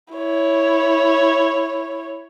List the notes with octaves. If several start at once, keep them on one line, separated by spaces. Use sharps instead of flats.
E4 C#5